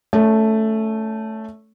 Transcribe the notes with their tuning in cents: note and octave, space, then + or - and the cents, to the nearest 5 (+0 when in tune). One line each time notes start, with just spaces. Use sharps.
A3 +0 C#4 +30